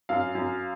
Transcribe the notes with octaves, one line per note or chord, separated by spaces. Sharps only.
F#2 F5
F#2